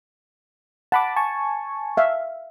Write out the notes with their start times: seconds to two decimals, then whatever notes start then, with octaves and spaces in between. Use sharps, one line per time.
0.92 F#5 A5 B5 D6
1.16 G#5 A5 C#6
1.97 E5 F5